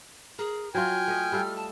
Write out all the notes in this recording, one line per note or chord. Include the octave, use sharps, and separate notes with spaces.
G#4 A#4
F#3 F4 G5 G#5 F6
A3 D#5
G3 A4 F5
A5